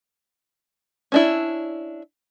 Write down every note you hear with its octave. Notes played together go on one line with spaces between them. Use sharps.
C#4 D4 E4